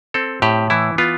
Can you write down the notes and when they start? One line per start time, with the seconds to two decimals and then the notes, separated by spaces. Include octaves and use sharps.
0.14 C4 A4
0.42 A2 G4
0.70 E3 E4
0.98 B3 F4